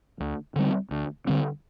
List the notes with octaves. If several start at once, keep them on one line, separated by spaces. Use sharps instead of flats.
D2
D3 G3 C4
D2
D3 G3 C4